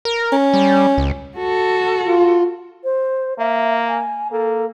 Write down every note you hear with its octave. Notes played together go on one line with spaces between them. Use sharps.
A#4
C#4
G3
C#2
F#4 A4
F4
C5
A#3 E5
G#5
A#3 A4